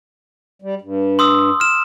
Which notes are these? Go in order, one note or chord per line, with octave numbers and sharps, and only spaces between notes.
G3
G2
C6 D#6 E6
F6 E7